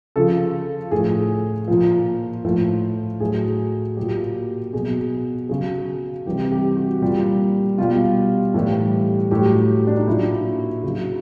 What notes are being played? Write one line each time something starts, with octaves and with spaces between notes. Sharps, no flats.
C#3 F3 A4
A2 F3 G#4
A#2 F3
A2 F3
A2 F#3 G#4
A#2 F#3 G4
B2 F#3 G#4
C#3 F#3 G#4
C3 E3 G3 G4
G4
F#4
A#2 G3
B2 G3 F4
A2 E3 G3
A2 F#3 G4
D4
D#4
A#2 F#3 E4
C#3 F#3 E4